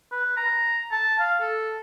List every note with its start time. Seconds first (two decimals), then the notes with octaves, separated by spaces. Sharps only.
0.12 B4
0.37 A#5
0.92 A5
1.20 F5
1.41 A4